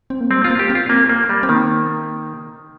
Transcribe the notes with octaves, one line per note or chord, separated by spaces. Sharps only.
C4
A#3
G3 C4
F4
A#3
G4
C4
F4
A#3
A#3
G3
C4
D#3 A#3